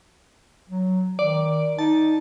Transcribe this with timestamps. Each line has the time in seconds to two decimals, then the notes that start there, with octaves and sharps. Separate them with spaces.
0.69 F#3
1.19 D#3 D5
1.79 D#4 A5